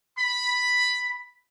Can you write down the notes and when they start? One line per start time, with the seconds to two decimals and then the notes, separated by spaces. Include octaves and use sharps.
0.18 B5